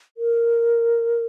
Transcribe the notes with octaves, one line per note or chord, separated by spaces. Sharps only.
A#4